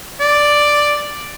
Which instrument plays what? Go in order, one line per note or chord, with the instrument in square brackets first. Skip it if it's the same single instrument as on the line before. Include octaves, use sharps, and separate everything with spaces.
[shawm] D5